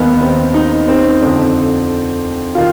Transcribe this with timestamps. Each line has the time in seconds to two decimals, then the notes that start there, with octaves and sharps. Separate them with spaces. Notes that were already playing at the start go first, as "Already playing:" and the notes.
Already playing: D#2 D#3 B3
0.21 C4
0.54 D#4
0.88 C4
1.22 F2 D3
2.55 D#3 F4